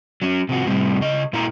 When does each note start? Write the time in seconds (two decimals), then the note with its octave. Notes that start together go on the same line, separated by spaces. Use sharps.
0.22 F#3 C#4
0.49 C3 F3 F#4
0.66 A2 C3 G3
1.01 C#3 D#5
1.33 A#2 A#3 E4 A#5